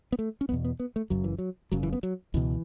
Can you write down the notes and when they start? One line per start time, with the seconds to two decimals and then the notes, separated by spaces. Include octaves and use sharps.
0.12 B3
0.19 A3
0.41 C#4
0.49 E1 E2 B2 B3
0.65 B3
0.80 B3
0.96 A3
1.10 F#1 F#2 C#3 F#3
1.24 E3
1.38 F#3
1.72 F#1 F#2 C#3 F#3
1.83 E3
1.93 B3
2.03 F#3
2.34 C#2 B2 E3